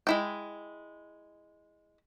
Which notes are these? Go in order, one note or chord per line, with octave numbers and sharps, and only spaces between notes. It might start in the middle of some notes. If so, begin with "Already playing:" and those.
G#3 E4 G5